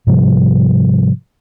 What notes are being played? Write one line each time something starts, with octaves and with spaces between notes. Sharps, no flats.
G#2 C3 F3 G3